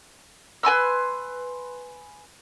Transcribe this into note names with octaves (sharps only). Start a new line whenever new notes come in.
B4 G#5 C6 E6